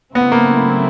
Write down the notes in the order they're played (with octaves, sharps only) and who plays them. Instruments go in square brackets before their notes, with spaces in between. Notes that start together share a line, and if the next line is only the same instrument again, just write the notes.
[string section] C#3 F#3 A3 C4 E4 [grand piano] B3
[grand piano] A#3